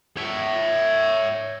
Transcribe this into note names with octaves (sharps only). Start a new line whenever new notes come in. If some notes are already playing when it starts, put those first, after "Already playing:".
C#5 E5